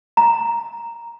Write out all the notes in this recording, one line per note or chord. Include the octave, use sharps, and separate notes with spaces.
A#5